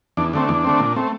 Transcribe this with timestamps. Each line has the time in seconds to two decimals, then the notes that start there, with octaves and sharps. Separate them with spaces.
0.17 E2 D4
0.33 D3 A3 C4
0.49 E2 D4
0.64 D3 A3 C4
0.80 A#2
0.96 A3 C4